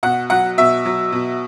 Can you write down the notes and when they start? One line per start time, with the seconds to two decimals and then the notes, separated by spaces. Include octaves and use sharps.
0.03 B2 F#5
0.30 F#3 F#5
0.58 B2 E5
0.85 F#3
1.12 B2